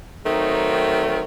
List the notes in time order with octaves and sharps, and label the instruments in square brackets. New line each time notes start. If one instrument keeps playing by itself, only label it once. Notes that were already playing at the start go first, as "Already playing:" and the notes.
[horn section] D#3 F#3 A3 C4 D#4